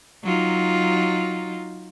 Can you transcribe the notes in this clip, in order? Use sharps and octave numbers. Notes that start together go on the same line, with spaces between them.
F#3 D#4 F4